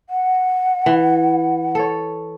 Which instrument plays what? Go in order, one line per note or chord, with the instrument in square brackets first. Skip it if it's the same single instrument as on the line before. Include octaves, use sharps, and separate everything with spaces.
[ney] F#5
[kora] E3
A4 C#5